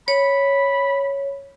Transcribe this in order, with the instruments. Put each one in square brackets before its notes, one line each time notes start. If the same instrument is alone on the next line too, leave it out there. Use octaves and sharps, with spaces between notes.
[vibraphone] C#5 [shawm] B5